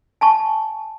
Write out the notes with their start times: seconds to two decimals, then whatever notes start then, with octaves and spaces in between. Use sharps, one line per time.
0.21 G#5 A5 C#6